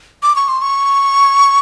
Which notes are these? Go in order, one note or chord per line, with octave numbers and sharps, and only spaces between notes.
D6
C#6
C6
C#6